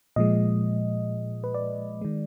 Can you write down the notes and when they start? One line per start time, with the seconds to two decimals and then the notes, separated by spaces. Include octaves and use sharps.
0.16 A#2 F3 G#3 D#5
1.44 B4
1.54 D5
2.01 D#3 G#3